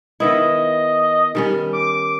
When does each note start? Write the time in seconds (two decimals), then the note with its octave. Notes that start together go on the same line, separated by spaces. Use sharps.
0.20 D#3 B3 E4 D#5
1.35 D#3 G3 C#4
1.73 D6